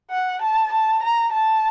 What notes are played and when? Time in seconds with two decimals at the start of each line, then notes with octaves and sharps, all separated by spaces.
0.10 F#5
0.42 A5
0.72 A5
1.03 A#5
1.32 A5